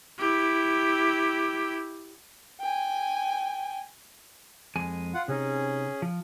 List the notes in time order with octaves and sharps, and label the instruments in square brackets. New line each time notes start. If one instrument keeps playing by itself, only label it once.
[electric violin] E4 G4
[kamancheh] G5 G#5
[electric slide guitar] F2 G#3 G#5
[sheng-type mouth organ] F4 F#5
[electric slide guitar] C3 D#4 [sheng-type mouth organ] C#4 G#4
[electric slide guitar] F3